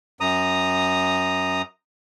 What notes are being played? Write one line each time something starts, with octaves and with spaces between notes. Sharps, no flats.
F#2 A#5 D#6